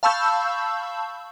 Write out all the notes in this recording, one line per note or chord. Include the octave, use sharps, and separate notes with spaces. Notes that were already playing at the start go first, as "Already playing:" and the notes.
F5 A5 B5 C#6 E6 G6